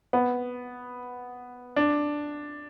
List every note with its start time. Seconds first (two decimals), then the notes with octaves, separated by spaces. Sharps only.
0.13 B3
1.76 D4